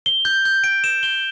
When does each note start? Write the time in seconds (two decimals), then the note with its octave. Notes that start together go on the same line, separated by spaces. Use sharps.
0.06 G7
0.25 G6
0.45 G6
0.64 D7
0.84 E7
1.03 G7